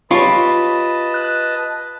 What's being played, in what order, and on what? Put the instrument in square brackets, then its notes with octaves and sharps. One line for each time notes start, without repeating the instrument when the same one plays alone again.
[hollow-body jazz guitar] F4 G4 C#5 [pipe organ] B4 D#5 A5 [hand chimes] B5
[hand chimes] F#6